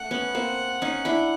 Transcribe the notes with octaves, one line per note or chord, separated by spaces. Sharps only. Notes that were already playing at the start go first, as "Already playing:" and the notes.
Already playing: A3 F#5
B3 C#4
A#3 C4
C#4 D#4
D4 E4